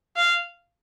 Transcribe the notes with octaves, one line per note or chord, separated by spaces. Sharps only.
F5